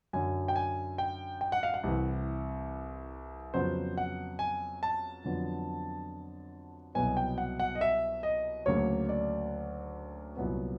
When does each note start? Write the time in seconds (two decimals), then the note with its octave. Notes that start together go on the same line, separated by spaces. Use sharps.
0.13 F#2 D3 F#3 G#5
0.48 G5
0.56 G#5
0.98 G5
1.41 G5
1.52 F#5
1.63 F5
1.74 F#5
1.83 C2 C3 E3
3.54 F2 C#3 F#3 B3 C5
3.98 F#5
4.39 G#5
4.83 A5
5.24 F2 D3 F#3 B3
6.95 C2 B2 F#3 B3 G#5
7.17 G5
7.38 F#5
7.60 F#5
7.75 D#5
7.81 E5
8.23 D#5
8.66 D2 C#3 F#3 A#3 C#5
9.09 D5
10.37 C2 A#2 F#3 B3